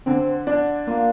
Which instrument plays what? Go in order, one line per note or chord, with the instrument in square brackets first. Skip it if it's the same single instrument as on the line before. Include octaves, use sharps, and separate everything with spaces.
[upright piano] D3 [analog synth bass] C4
[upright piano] D4
[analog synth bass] A#3 [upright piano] F4